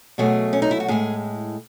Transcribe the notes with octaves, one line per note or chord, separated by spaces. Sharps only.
B2 F#3 A3 G#4
C#4
D#4
E4
F#4
A2 G#3 G#4